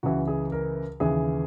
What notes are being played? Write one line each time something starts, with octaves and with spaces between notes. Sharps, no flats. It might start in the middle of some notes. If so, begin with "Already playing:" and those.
C#2 C#3 E3 F#4
G#4
A#4
D#2 C#3 E3 G#4